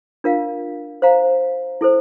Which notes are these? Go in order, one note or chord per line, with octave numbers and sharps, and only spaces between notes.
D4 F4 A#4 F5
C5 F5 A#5
E4 A4 C5